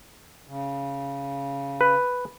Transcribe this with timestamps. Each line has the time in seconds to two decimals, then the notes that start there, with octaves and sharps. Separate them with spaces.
0.47 C#3
1.81 B4